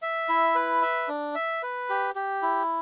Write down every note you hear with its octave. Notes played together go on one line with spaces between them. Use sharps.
E5
E4
B4
E5
D4
E5
B4
G4
G4
E4